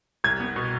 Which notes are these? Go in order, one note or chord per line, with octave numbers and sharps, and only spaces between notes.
C2 G#6
B3
B2